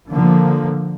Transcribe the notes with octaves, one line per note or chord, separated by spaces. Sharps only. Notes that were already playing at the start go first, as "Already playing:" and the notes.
D3 F3 A#3